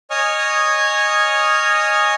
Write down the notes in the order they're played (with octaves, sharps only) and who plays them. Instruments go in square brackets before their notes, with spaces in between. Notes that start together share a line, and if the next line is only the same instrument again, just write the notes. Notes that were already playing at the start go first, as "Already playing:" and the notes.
[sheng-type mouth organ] C#5 D#5 G#5 C#6 D#6 F6